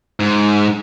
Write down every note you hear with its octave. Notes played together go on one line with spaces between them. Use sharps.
G#2